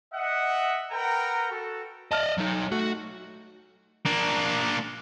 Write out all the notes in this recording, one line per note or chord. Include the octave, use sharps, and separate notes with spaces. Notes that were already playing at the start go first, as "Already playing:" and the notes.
D#5 E5 F#5
A#4 B4 F#5 G5 A#5
F#4 A4
D5 D#5 A5 F6
F#3 D#4
A3 F#4
A#3 D4